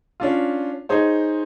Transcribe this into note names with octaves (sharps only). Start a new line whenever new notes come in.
C#4 D4 F4
D#4 G#4 C5 C#5